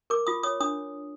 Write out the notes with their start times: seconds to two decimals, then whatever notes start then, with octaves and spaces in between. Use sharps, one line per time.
0.10 A#4 D6
0.27 F4 D#6
0.43 C#5 D#6
0.60 D4 D#6